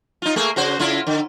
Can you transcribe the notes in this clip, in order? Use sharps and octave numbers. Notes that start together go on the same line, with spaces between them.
D#4 F4
A3 A#3 G#4
C#3 F#4 C5
C#3 E4 F4
D3